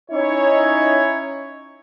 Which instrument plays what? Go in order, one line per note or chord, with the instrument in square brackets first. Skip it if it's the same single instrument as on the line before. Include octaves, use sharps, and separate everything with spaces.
[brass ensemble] C#4 D#4 E4 C#5